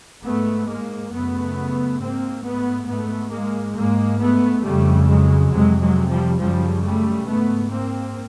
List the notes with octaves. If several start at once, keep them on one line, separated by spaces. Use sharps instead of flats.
G#2 A3 B3
G#3 A#3
F#2 C#3 A3 B3
G#2 A#3 C4
A3 B3
G#2 A3 B3
G#3 A#3
G#2 G#3 A#3
A3 B3
F2 C#3 G3 A3
F#3 G#3
F2 C3 F#3 G#3
F#3 G#3
F3 G3
F#2 C#3 F3 G3
G3 A3
G#2 A3 B3
A#3 C4